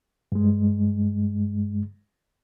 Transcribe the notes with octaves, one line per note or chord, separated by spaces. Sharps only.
G2 G#3